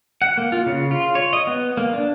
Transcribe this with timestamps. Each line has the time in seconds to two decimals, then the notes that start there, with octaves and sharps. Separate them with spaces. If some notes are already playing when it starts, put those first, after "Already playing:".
0.22 F#5
0.38 A#3
0.52 F4
0.66 C#3
0.91 F4
1.15 C#5
1.33 D#5
1.47 B3
1.77 A#3
1.93 D4